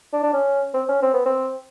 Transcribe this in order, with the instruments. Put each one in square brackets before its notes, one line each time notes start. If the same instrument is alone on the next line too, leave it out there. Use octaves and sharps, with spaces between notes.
[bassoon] D4
D4
C#4
C4
C#4
C4
B3
C4